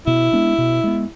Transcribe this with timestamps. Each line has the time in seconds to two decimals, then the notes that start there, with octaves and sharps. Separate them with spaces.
0.07 B2 E4
0.33 G#3 B3 D4
0.58 B2
0.84 G#3 B3